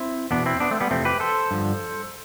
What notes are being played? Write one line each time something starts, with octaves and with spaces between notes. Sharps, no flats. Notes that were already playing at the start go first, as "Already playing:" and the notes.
Already playing: C4 E4
E2 B2 B3 D4
C4 E4
B3 D4
A3 C4
G3 B3
F2 C3 E3 A3 C4
G4 B4
A4 C5
G2 D3 F3